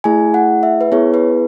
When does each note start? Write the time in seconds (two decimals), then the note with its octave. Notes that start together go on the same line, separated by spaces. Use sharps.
0.04 A3 E4 G#4 G#5
0.34 F#5
0.63 E5
0.81 B4
0.92 B3 E4 G#4 C#5
1.14 B4